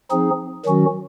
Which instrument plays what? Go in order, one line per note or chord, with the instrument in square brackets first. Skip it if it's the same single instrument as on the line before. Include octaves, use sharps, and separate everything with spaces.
[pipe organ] F3 C4 D#4 G#4
D#3 F#3 C#4 F#4